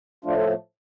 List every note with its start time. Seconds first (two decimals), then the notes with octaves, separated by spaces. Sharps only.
0.25 A2 F3 A3 D4 F4
0.37 F4 A4